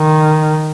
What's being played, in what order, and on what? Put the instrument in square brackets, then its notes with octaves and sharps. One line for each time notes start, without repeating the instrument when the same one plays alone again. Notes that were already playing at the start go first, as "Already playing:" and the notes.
Already playing: [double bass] D#3